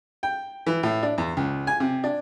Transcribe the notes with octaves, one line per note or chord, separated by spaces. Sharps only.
G5
E3
A2
D4
E2
C#2
G#5
C3
D4